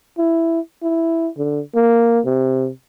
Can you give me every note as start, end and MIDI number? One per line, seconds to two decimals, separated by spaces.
0.18 0.60 64
0.83 1.29 64
1.38 1.60 50
1.75 2.20 58
2.26 2.69 48